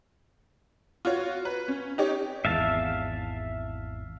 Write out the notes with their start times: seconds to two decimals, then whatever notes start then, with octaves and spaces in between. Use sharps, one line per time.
1.05 F4 F#4 C#5
1.45 B4
1.68 C#4
1.98 D#4 G4 C#5
2.45 G#1 E2 E5 F5 A5